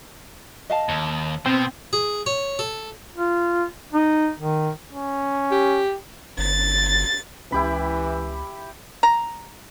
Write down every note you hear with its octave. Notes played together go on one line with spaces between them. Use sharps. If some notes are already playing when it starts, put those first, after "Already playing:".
D#5 F5 A5
D#2
B2 C4
G#4
C#5
A4
F4
D#4
D#3
C#4
G4
G1 A6
C#2 E3 C#4 E4 G4 B5
A#5